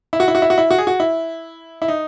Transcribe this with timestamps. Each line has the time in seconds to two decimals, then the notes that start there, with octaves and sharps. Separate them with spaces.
0.13 E4
0.20 F#4
0.28 E4
0.35 F#4
0.42 E4
0.50 F#4
0.58 E4
0.71 F#4
0.78 G#4
0.87 F#4
1.00 E4
1.82 E4
1.88 D#4